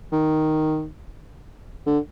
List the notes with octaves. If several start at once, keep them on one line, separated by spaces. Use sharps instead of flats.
D#3
D3